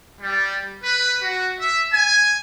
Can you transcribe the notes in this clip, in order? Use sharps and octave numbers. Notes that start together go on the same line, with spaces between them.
G3
B4
F#4
E5
G#5